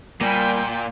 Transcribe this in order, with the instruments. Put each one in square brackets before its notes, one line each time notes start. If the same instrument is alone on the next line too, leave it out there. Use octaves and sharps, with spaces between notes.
[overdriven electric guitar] A#2 [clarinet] G3 [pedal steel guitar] A#3 G#5 B5 [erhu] G5